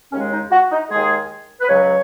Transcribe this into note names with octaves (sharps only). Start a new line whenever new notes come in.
D#2 C#3 G#3 C#4
D#4
F#4
D#4
D#2 D#3 G#3 G#4
B4
C#2 C#3 F#3 C#5